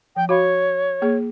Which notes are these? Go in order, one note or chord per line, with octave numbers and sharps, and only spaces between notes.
F3 G5
F#4 C#5 F5 B5
A#3 G#4